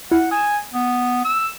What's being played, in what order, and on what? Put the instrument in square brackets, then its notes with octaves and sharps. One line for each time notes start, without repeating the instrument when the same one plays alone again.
[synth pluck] E4 [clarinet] F#5
[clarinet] G#5 [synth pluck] D#6 E7
[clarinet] B3
E6